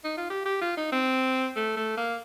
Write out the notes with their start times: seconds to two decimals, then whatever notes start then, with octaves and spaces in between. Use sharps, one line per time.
0.04 D#4
0.17 F4
0.30 G4
0.46 G4
0.61 F4
0.77 D#4
0.92 C4
1.56 A3
1.77 A3
1.97 A#3